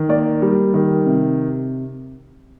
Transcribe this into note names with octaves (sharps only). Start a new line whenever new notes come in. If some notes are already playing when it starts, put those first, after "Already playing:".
Already playing: D#3
A#3 D5
G3
D#3
C3